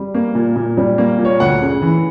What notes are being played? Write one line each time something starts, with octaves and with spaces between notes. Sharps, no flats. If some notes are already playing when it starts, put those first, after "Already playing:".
Already playing: G3
A#3
A#2
A#2
G3
A#3
A#2
C#5
D2 F#5
C#3
E3